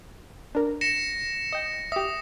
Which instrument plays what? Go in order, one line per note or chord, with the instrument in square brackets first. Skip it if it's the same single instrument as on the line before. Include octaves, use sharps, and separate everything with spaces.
[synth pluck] D4 A#4
[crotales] A#6 C#7 E7
[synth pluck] D#5 G5
[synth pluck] G4 E5 [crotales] D#6